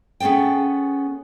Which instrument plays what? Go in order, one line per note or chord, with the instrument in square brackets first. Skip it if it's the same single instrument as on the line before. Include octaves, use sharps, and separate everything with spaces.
[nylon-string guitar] B3 C#4 G#4 A4 G5